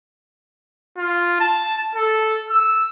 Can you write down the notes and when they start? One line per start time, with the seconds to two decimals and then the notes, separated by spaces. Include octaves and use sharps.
0.97 F4
1.40 A5
1.95 A4
2.50 E6